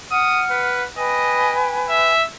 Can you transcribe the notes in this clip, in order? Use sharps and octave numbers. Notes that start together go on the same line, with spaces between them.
F#5 D#6 F6
B4
B4 D#5 G5 G#5
E5